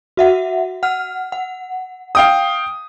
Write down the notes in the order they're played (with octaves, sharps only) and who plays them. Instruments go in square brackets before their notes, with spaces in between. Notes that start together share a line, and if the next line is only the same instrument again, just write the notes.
[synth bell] F#4 E5 F#5
F#5 F6
F#5
[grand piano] F5 G5 D#6